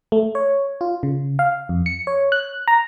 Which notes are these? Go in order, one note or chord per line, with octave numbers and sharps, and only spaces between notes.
A3
C#5
F4
C#3
F5
F2
C#7
C#5
F#6
A#5